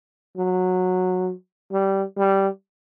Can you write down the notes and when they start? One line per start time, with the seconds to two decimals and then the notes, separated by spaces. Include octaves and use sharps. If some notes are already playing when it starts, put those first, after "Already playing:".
0.37 F#3
1.72 G3
2.16 G3